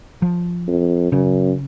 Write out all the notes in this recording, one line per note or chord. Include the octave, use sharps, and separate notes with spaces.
F3
F2
F#2 C#3